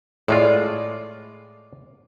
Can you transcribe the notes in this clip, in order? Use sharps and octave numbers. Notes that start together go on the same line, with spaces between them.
A2 G#3 F4 D5